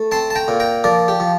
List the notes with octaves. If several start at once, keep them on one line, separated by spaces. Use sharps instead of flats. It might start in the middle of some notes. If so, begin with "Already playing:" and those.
Already playing: A3
C4 A5 C6
A5
G5 A#5
A#2
G5 A#5
F3 A#4 D5
G4
F3